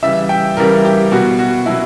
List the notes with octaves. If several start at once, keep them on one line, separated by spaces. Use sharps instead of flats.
C#3 E3 G3 E5
G5
C#3 E3 G3 A#4
G4
B2 F#3 F#4
F#4
B2 F#3 E4